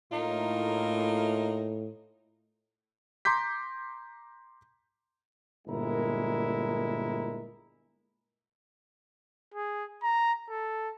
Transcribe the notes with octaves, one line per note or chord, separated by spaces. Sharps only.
A2 A#3 D#4 F4
A#5 C6 D6 G6 B6
G1 A#2 G#3 E4 A#4 A#5
G#4
A#5
A4